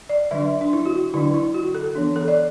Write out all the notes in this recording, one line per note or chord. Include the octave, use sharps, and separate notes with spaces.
D5
D3 F#3 D4 E5
D4
E4
F#4
D3 F#3 D4 E4
E4
F#4
A4
E3 B3 D4
A4
D5